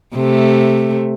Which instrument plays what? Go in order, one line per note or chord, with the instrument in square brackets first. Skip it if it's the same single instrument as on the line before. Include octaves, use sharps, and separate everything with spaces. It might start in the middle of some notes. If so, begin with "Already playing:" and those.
[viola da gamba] C3 A3